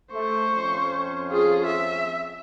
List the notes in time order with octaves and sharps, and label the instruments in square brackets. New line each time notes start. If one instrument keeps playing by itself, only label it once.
[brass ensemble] A3 [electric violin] C5 C#6
[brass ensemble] F2 C#4
[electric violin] F4 G#4
E5